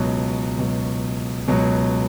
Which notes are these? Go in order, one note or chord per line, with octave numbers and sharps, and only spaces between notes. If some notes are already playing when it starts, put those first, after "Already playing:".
Already playing: C#2 B2 F#3
C#2 B2 F#3
C#2 B2 F#3